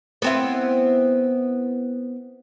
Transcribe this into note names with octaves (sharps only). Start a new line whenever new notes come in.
B3 C4 E4